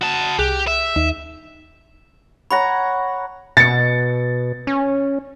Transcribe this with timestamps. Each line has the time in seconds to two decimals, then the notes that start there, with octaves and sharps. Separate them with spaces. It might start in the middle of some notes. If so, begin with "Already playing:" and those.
0.01 F#4 A5
0.39 C2 G4 G#4 F#6
0.67 E5
0.96 D#2 D#4
2.51 C#5 F#5 A#5 B5
3.57 B2 A6 C#7
4.67 C#4